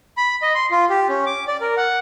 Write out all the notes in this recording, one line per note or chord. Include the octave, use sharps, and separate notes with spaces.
B5
D#5
C6
F4
G4
C#4
D6
D5
A#4
F#5